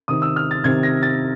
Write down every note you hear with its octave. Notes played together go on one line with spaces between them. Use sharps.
C3 D#3 D#6
E6
F6
A6
C3 D#3 G#6
A#6
A6